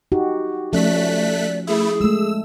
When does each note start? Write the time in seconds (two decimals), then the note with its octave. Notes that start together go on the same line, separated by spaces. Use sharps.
0.12 D#4 F#4 G4
0.73 F3 A3 C#4 D5 F#6 B6
1.67 A3 E4 G#4
2.01 G#3 A3 E6